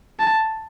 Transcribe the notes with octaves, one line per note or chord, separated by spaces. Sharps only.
A5